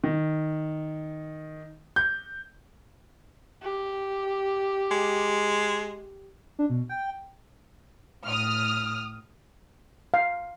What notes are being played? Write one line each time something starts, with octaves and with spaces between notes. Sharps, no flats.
D#3
G6
G4
G#3
D4
B2
G5
A2 D#6 F6
F5